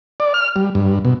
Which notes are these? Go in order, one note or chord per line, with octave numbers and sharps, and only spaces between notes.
D5
F6
G3
G2
B2